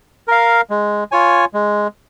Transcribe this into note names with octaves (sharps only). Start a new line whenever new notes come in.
A#4 F5
G#3
F4 C#5 G#5
G#3